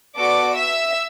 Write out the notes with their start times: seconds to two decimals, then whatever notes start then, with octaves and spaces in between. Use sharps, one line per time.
0.16 B3 F#4 A4 D5 D6
0.55 E5 E6